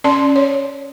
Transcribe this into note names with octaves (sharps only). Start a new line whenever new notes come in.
C#4 D5 A5 C6
C#5